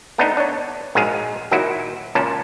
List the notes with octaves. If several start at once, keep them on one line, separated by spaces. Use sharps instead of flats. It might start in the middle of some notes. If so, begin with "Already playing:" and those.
A3 B3 D4 D#4
D4 C#5
A#1 G#2 F#3 G#3 G#4 F5
A#2 D#3 F#3 E4 F#4
C#2 A#2 C#4 F4 A5